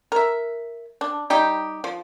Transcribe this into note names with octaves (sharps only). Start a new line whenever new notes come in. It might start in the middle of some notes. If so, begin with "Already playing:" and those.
A#4 E5
D4
G3 D#4 G4
F3